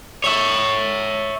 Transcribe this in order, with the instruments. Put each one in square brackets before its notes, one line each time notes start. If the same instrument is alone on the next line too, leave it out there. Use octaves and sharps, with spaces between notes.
[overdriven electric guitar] C#5 E5